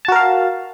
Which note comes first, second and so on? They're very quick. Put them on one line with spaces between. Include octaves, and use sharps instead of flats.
A5 F#4 A#4 F5